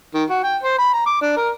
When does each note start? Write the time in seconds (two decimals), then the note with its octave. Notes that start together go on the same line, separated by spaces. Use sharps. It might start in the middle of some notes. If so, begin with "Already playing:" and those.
0.14 D#3
0.30 F#4
0.43 G5
0.63 C5
0.78 B5
0.93 A#5
1.06 D6
1.22 D4
1.37 A#4